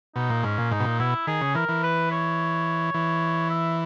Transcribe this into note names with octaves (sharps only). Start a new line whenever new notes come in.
B2 D#4
A#2
G#2 C#4
A#2
G#2 D#4
B2
A#2
B2 E4
D#3 G#4
C#3
E3 A#4
E3
B4
C#5
E3
E5